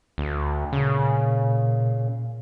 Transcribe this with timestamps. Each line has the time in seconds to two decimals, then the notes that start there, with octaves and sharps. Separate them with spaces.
0.18 D2
0.72 A#2 C#3